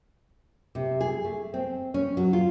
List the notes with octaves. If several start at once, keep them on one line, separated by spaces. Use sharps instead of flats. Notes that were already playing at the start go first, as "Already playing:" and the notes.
C3
G#4
A3
C4
C#4
F#3
F4